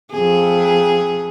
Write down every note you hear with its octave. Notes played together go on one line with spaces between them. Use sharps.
F2 G#4